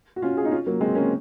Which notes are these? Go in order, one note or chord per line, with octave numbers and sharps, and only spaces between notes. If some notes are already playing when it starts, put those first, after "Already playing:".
F#4
C#4 F4
F4 G#4
D#4
C#4 F4
F#3 A#3
G#3 C4
A#3 C#4